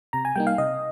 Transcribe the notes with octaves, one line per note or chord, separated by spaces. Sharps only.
C3 A#5
G#5
G3 A#3 D#4 G5
F5
C3 D#5